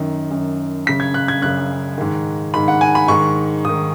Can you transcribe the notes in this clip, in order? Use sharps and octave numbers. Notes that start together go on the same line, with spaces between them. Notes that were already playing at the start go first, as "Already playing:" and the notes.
Already playing: F#2 D#3
F#2 D#3
F#2 C#3 B6
G#6
F#6
G#6
F#2 C#3 F#6
G#2 D#3
G#2 D#3 B5
F#5
G#5
B5
G#2 D#3 C#6
G#2 D#3 D#6